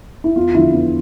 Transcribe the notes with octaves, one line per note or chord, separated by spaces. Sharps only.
E4
E2 F4
D3 F3 E4
E2